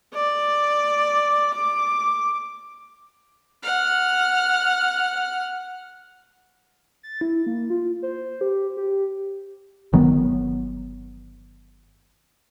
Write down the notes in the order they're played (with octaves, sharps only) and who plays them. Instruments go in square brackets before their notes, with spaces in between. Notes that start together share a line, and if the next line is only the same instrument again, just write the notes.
[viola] D5
D6
[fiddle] F#5 F6
[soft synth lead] A6
E4
A#3
F4
C5
G4
G4
[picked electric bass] G1 D#3 F#3 B3